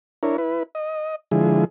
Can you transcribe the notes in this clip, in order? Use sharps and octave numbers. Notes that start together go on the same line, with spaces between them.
D4 E4 A#4 C#5
E4 B4
D#5
D3 F3 G#3 E4 G#4